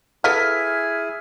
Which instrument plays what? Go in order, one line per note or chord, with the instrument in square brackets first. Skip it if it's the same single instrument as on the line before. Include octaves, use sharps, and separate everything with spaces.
[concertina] E4 G#4 G#5 [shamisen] A4 B4 F5 [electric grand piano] F6 B6